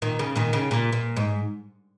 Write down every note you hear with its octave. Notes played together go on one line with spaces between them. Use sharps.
A#2 D#3
C#3
A#2 D#3
C#3
A#2
A#2
G#2